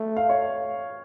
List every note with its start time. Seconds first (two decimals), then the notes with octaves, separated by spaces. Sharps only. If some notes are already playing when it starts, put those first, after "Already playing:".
Already playing: A3
0.17 F5
0.29 C#5